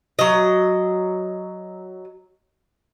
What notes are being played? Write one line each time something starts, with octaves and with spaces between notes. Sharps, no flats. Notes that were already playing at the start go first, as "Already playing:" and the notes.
F#3 D#5